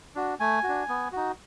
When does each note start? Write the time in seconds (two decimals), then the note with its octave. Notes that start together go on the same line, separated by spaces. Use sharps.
0.15 D4 F#4
0.40 A3 G#5
0.63 F#4
0.69 D4
0.89 B3
1.12 D#4 F#4